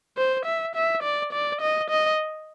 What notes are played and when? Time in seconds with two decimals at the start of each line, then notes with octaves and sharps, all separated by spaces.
0.17 C5
0.45 E5
0.75 E5
1.03 D5
1.33 D5
1.61 D#5
1.90 D#5